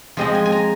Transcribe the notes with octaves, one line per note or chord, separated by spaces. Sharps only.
F3 G#3 C4 D#5
G#5
G#5
A#5